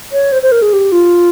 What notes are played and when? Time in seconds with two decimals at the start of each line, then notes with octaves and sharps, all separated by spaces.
0.12 C#5
0.32 C5
0.42 C5
0.52 A#4
0.62 G#4
0.73 G4
0.92 F4